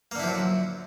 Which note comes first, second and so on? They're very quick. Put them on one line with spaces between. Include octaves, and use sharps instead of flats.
A#3 D3 E4 F3 F#3